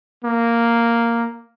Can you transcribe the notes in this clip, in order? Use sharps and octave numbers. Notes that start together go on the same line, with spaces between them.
A#3